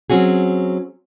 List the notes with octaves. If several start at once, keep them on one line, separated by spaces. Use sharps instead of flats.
F#3 C4 C#4 F#4 G#4